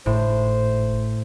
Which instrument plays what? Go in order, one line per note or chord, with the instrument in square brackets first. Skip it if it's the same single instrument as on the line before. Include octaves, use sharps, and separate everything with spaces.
[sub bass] G#1 [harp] A2 [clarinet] C5